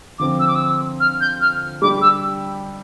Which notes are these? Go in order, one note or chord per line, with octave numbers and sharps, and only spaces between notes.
D3 F3 C4 D6
E6
D6
E6
F6
G6
F6
G3 D4 G4 D6
E6